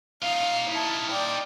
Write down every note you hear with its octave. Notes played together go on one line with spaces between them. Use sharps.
D#4 F4 F5
E4 A5
D5 G5